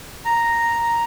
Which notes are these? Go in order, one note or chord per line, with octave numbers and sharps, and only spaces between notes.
A#5